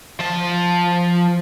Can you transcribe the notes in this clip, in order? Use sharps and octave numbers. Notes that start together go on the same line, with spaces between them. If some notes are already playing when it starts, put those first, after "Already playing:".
F3 A5